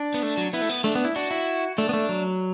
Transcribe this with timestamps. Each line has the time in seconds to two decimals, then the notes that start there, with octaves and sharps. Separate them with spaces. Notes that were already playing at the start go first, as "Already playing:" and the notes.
Already playing: D4
0.14 B3
0.23 A3
0.37 F#3
0.53 B3 E4
0.62 A3
0.69 B3
0.84 A3 D4
0.95 B3
1.05 E4
1.16 D4 F#4
1.31 E4
1.78 A3 D4
1.89 B3
1.93 A3
2.09 F#3